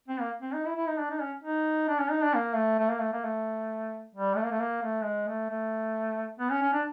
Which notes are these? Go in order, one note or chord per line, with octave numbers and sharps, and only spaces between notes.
C4
A#3
C4
D#4
E4
E4
D#4
D4
D#4
C#4
D#4
D4
C#4
D#4
D4
A#3
A3
A3
A#3
A3
A#3
A3
G3
A3
A#3
A3
A#3
A3
G#3
A3
A3
B3
C#4
C#4
D4